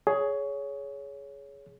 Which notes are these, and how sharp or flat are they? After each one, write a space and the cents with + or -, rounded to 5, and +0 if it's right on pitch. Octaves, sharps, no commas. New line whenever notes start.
G#4 +10 C#5 +15